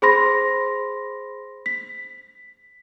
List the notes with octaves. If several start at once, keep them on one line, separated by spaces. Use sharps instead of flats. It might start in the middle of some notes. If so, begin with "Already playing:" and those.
G#4 C5 B5 C6 A#6
B6